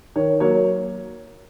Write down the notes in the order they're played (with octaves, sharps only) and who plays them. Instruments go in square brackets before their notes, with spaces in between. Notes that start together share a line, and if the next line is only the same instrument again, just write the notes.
[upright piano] D#3 C#5
F#3 A#3 C#5